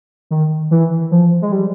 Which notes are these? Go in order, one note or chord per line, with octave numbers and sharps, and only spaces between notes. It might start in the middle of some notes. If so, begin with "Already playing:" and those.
D#3
E3
F3
G#3
G3